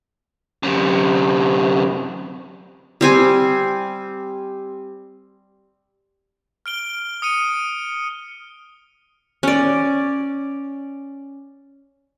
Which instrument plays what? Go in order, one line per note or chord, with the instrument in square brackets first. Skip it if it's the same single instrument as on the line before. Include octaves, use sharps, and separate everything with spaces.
[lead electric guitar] F#2 C3
[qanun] G3 C4 G#5
[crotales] F6 D7 G7
D#6 C#7 D#7
[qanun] C#4 D5